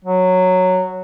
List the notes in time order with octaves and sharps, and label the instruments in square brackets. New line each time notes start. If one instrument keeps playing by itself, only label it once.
[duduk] F#3